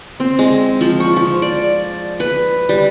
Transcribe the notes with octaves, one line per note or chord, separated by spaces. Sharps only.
C4
G#3
F3
C#6
F3
D5
B4
G3